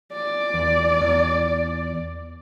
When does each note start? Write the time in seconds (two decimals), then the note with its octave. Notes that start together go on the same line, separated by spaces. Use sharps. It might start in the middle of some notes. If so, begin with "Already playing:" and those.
0.13 D5
0.54 E2
1.01 E2